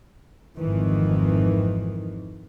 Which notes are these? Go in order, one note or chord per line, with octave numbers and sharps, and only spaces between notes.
G#1 F2 D#3 E3